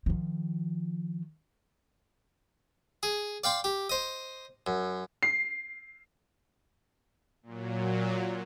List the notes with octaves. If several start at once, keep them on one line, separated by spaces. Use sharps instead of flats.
D#3 F3
G#4
D5 F5 G5 C6
G4
C5 D#5
F#2
C7
A#2 F#3